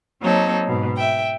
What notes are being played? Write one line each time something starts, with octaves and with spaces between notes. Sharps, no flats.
F#3 A#3 C4 D#4 A4 C#5
G#2 B2
E5 G5